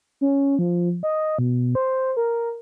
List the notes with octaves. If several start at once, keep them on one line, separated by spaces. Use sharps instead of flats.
C#4
F3
D#5
B2
C5
A#4